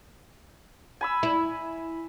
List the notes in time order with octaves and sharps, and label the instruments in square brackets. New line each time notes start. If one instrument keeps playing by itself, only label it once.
[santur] G#5 B5 E6
[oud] E4